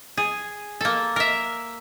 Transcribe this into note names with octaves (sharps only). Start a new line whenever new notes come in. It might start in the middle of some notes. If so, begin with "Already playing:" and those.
G#4
A#3 A4
A#4 E5